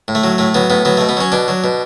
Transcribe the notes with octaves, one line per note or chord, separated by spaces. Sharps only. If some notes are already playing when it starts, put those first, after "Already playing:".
A2
A3
F#3
A2 A3
F#3 B3
A2 B3
F#3 B3
B2 A3
B3
F#3 C#4
B2 D4
F#3
B2